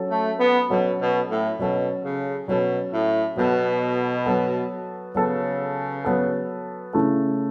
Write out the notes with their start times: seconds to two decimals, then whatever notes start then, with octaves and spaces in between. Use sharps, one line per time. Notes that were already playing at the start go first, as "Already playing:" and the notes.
Already playing: F#3 C#4 A4
0.10 A3
0.39 B3
0.70 B2 F#3 C#4 A4
0.99 B2
1.30 A2
1.59 B2 F#3 C#4 A4
2.03 C#3
2.48 B2 F#3 C#4 A4
2.92 A2
3.36 B2 F#3 B3 A4
4.26 F#3 B3 A4
5.15 C#3 F#3 B3 A4
6.05 F#3 B3 A4
6.93 C#3 A3 E4 A4